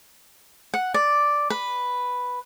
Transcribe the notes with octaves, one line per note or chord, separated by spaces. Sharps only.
F#5
D5
B4